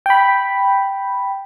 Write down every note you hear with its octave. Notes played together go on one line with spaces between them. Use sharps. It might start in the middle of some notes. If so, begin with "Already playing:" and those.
G5 B5